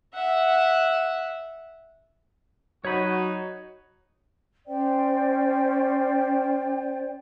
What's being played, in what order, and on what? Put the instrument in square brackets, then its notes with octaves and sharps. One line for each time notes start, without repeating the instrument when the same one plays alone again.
[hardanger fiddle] E5 F#5
[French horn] F#3 [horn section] D#4 F#4 [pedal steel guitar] C#5 B5
[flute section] C#4 C5 D5 G5